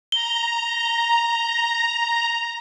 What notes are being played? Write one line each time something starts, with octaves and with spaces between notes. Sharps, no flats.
A#5 G7